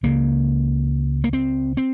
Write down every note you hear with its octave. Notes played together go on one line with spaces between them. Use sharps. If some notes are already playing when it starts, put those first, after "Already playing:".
C#2 C#3 A#3
A#3
C4
C4